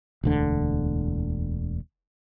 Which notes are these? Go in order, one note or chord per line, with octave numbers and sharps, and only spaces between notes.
E1 D2 D3